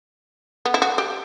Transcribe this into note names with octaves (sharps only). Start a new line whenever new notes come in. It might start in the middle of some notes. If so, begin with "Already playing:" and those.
B3
E4
F#4
G4